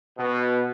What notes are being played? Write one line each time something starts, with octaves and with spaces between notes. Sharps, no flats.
B2